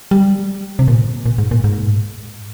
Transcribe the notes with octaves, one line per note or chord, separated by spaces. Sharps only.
G3
C3
A#2
A#2
G#2
A#2
G#2